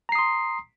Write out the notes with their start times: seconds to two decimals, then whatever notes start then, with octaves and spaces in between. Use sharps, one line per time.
0.09 A#5
0.12 C7
0.15 D#6
0.19 C6